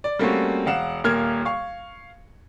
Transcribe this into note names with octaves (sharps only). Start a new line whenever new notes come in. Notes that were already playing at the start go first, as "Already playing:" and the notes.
D5
G3 A3 A#3 C4 C#4 F#4
E1 F5 F#5 E7
D#1 A#2 A#3 A#4 F6 G#6
F5 C#6